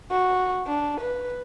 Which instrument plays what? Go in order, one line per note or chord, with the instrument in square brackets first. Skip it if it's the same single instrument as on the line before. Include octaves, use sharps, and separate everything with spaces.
[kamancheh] F#4
D4
B4